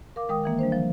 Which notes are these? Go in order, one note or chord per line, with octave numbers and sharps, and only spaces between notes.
A#4 F5 D6
D#3 G#3 A#4 G5 D#6
D#3 E3 A#3
G3 D4 C5
D3 F3